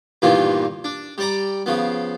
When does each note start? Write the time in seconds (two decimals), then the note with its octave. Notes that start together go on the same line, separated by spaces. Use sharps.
0.22 G2 A#2 D#3 E3 B3 F4
0.84 D4
1.18 G3 D5 A#5
1.66 C#3 F3 B3